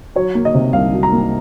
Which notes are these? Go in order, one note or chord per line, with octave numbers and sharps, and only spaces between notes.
F#3 C#5
A#3
D#5
C3
C2 F5
F#3
A#5
A#3